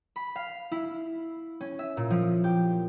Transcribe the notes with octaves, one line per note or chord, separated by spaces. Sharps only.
B5
F5
E4
C#4
E5
A#2
F3
G4